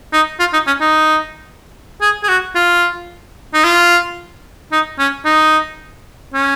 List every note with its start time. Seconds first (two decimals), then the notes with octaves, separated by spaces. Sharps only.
0.13 D#4
0.39 F4
0.53 D#4
0.67 C#4
0.81 D#4
2.01 G#4
2.23 G#4
2.29 F#4
2.55 F4
3.54 D#4
3.64 F4
4.72 D#4
4.99 C#4
5.25 D#4
6.34 C#4